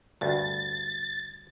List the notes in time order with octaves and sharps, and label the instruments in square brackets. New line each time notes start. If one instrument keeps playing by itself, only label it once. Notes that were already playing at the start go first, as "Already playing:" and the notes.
[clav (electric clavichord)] D2 G2 [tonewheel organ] A6